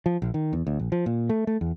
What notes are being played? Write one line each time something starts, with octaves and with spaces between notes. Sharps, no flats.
F3
A#1
D#3
E2
D2
A#1
F3
A#2
A3
A3
E2